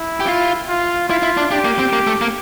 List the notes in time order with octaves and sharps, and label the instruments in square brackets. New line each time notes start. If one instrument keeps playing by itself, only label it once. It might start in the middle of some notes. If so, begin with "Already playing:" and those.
Already playing: [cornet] E4
[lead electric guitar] G4
F4
[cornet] F4
[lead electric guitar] E4 [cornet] F4
[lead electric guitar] E4
D4
[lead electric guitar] D4 [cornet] G4
[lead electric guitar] A#3
C4
A#3
A3
A#3